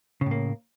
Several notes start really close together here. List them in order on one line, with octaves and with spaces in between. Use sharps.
C#3 A2 A#3